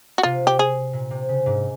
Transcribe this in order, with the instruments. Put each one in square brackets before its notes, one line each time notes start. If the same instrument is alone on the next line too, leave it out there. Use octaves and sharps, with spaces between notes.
[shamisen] F#4
[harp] C3 [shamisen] F4
[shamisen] G4
G#4
[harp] A#2
C3
C#3
G#2